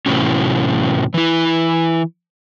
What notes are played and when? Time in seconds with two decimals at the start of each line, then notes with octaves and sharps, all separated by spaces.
0.06 A2 C3 E3 F#3 C#4
1.14 E3 E4